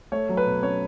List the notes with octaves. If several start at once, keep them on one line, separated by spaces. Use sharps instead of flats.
A3 C#5
F#3
B4
B2
C#4 C#5